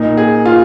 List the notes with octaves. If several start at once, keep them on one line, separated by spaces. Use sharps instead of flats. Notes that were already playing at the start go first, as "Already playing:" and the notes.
Already playing: A#2 A#3 D#4
G#4
F4